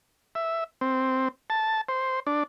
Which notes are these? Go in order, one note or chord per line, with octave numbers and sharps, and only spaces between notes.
E5
C4
A5
C5
D4